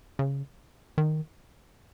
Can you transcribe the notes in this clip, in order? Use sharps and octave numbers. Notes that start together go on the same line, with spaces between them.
C#3
D#3